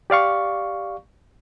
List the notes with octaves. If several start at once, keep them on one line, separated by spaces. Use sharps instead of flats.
G4 D5 F5 C#6